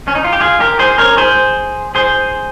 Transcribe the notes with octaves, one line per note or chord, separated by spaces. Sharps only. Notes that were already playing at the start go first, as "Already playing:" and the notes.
C#4
D#4
F4
G4
F4 G#4
G4 A#4
G#4 C5
A#4 C#5
G#4 C5
G#4 C5